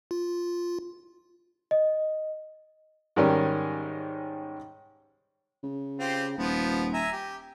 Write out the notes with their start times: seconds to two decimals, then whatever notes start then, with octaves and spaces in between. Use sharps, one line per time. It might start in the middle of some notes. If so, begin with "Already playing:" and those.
0.11 F4
1.71 D#5
3.16 G#2 D#3 G3 C#4
5.63 C#3
6.00 C4 F4 G4
6.38 D#1 F3 B3
6.93 E5 G#5 A#5
7.13 G4